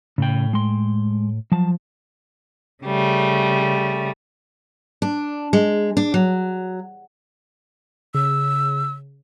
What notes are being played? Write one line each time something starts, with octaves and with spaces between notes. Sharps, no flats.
A2 C#3 G5
G#3 C6
F3 F#3 A5
C#3 G3 A3
D4
G#3
D4
F#3
C#3 E6